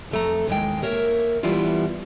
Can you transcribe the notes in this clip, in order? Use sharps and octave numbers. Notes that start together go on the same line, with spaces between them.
F2 A3 A#5
D#2 A2 C3 G#3 G5
A#3 A#4 C#5 E5
E3 G3 B3 E4 F4